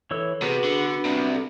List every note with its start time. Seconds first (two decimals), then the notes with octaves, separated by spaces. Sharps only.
0.11 E3 A4 C#5 E6
0.42 C3 B3 F#4 G#4 B4
0.64 D3
0.89 D4
1.05 C2 C3
1.34 A4